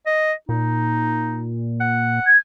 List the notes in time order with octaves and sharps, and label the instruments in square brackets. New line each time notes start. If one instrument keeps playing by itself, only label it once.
[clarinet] D#5
[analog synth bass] A#2 [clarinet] D#4
[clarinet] F#5
[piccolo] G#6